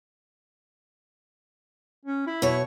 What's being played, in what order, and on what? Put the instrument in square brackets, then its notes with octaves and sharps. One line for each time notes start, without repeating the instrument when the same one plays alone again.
[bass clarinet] C#4
E4
[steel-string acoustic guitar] B2 C#5